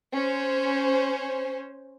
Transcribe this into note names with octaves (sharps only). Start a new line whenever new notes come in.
C#4 C5